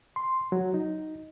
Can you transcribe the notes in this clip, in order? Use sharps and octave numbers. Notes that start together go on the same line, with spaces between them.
C6
F#3
D#4